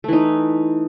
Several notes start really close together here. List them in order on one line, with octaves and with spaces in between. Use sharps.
A3 E3 D#4